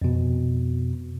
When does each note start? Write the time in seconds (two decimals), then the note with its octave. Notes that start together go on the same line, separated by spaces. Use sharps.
0.02 F2 B2